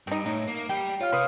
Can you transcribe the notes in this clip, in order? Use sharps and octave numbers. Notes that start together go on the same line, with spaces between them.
G2 C4 D#4
A2 D#4
A#3
G3 G4 G5
F4 C#5 F5 F6
C3 B4 C6 D#6 F6